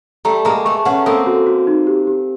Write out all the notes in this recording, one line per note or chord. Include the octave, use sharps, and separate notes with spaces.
G3 A3 A#5
G#3 A#3 A#5
A3 B3 C#6
B3 C#4 F#5
A#3 C4 A4
F#4
F#4
D#4
G4
G4